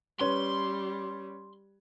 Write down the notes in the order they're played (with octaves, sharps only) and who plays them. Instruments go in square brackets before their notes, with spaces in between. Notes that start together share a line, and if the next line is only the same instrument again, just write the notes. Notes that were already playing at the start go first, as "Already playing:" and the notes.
[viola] G3 [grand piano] C#4 B4 C#5 [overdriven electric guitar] C6